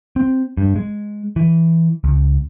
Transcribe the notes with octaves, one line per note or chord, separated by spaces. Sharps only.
C4
G2
G#3
E3
C#2